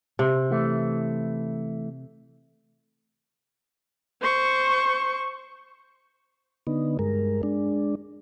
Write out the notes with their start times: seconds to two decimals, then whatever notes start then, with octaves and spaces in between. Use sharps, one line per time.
0.19 C3
0.50 E3 A3
4.22 C5 C#6
6.67 D3 B3 D#4
6.99 G2 G#3 A#4
7.43 G#3 D4